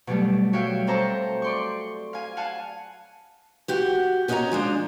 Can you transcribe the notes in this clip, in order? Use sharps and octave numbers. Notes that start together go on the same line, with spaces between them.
B2 F#3 G3 A3
F#4 C#5 E5 F5 G5
C4 A4 C5 A5 A#5 C#6
D5 C6 C#6
F5 G#5
F5 F#5 G#5 A5
F#4 G4 F#5
C#4 F#4 D#5 G5 G#5 A#5
F3 G#3 D4